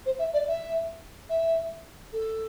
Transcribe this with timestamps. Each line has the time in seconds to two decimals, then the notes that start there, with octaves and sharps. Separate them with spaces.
0.06 C5
0.19 E5
0.33 D5
0.48 E5
1.30 E5
2.13 A4